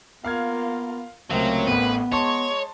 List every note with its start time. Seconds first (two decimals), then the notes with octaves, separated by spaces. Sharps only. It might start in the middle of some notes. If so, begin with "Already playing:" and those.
0.25 A#3 B3 F4 F5 F6 G#6
1.31 C#2 C3 F#3 A3 A#3 C4
1.67 A1 A2 B3 B4
2.12 G#3 C#5 A5 C6 C#6